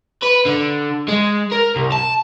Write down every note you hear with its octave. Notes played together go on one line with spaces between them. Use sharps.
B4
D3
G#3
A#4
C2
A5